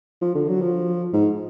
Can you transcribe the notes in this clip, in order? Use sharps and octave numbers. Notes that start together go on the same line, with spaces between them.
F3
D3
F#3
F3
G#2